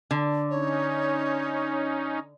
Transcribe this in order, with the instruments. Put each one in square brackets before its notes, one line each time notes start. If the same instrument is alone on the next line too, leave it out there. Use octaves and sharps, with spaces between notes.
[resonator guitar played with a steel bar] D3
[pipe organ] C#4 D#4 [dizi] C#5